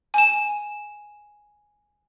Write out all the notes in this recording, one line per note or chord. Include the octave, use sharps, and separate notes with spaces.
G#5 E7